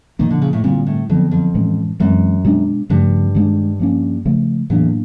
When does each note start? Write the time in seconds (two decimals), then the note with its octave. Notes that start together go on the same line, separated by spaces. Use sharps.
0.19 A#2 D#3 F3 A#3
0.31 D3
0.42 C#3
0.53 A2
0.64 A#2 D3 G3 C4
0.87 A2
1.09 F2 D3 F#3 B3
1.31 F2
1.55 A2 E3 G#3 C#4
2.00 F#2 E3 G#3 C4
2.45 B2 G#3 B3 D4
2.90 G2 C#3 F3 A3
3.35 D#3 G#3 B3 D4
3.80 F3 A#3 C#4
4.25 C#3 F3 A3
4.70 E2 A2 F#3 A#3 D4